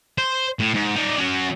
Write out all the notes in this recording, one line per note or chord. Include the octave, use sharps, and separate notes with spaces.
C5
A2
G#2
D#4 D5
C#4 F#4